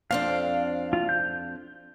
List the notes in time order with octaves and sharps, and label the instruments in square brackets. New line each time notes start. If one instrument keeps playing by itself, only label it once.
[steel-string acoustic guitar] F2 C4 D4 [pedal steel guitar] F5
[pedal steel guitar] F4
G6